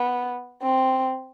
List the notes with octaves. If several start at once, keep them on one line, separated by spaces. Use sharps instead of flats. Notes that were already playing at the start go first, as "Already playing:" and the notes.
Already playing: B3
C4